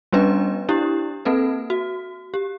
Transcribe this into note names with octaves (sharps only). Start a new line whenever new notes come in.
G3 B3 C#4 D4 B4 D#5
D4 E4 G4
A#3 C4 A4 B4
F#4
G4